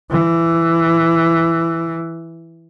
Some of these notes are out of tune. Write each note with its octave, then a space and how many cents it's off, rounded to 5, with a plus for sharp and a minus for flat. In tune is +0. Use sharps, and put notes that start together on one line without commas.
E3 +10